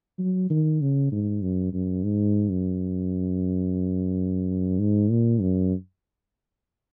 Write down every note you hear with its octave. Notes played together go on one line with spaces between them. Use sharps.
F#3
D#3
C#3
G#2
F#2
F#2
G#2
F#2
G#2
A#2
F#2